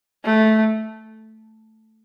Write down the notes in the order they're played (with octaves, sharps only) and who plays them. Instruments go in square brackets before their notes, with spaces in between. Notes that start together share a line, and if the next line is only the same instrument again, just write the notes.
[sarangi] A3